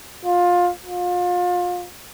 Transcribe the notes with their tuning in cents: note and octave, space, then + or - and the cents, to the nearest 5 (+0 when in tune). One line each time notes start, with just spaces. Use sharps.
F4 +20
F4 +30